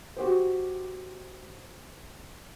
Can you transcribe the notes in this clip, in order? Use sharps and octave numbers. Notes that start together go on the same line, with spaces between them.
F#4 G4 C5